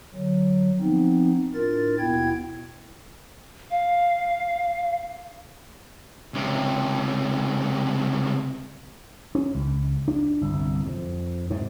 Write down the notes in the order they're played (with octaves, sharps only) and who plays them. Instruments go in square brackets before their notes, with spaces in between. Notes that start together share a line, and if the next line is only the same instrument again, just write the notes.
[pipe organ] D3 F#3
F3 B3 C4 D#4
A2 D4 F4 A#4 A6
D#2 B2 B3 E4 G5 G#6
[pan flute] F5
[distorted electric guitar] C#2 C3
[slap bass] C#4
C#2
D4
G1 C2
F2
G#2 C3